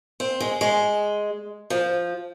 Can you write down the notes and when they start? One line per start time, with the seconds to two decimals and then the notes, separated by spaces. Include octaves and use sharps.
0.20 C4
0.40 G#3
0.61 G#3
1.70 F3